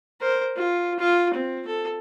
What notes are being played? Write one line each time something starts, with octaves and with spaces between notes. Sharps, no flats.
A#4 C5
F4
F4
C4
A4